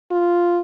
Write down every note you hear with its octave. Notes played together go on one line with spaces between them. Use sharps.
F4